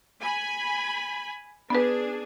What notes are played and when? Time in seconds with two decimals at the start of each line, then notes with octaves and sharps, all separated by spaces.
0.22 G#5 B5
1.70 B3 D4 G#4 B4